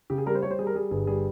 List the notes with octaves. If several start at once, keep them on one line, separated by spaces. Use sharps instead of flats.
C#3 G4
G#4
G3 A#4
C5
G3 C#5
C5
G3 G#4
A#4
G3 G#4
G1 G#4
G3 G#4